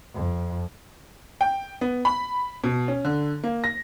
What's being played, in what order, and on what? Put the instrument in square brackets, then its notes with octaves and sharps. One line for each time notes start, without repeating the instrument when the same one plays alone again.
[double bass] F2
[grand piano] G5
B3
B5
B2
C#4
D3
A#3
A#6